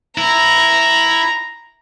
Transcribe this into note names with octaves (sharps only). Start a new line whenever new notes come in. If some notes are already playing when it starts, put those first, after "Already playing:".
E4 A#5